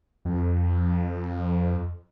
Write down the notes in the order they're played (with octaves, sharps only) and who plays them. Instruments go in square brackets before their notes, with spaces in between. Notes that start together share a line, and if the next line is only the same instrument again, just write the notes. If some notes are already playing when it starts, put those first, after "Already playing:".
[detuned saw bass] F2